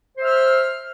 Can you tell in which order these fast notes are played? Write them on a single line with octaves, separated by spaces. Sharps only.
C5 E5 F6